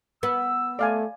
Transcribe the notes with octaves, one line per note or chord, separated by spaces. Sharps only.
B3 E6
A3 D5 F5 G#5